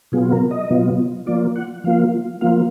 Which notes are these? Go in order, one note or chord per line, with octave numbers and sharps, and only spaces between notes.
B2 F#3 B3 F4 G#4
A#4
D#5
B2 F#3 B3 F4
F3 A#3 F4 D5
F#5
F3 A#3 F4 F5
F3 A#3 F4 F5